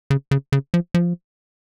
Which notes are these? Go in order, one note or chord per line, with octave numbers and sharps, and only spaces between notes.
C#3
C#3
C#3
F3
F3